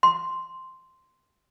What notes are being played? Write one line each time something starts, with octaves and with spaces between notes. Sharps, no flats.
C6